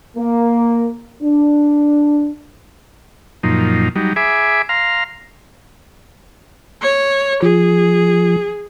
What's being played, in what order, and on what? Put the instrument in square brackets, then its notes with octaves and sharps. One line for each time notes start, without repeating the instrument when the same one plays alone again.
[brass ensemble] A#3
D4
[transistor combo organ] F#2 A#2 F3 D#4
F#3 G3 D#4
G#4 E5 G#5 B5 D6
F5 A#5 C6 F6
[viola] C#5
[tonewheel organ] F3 [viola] G#4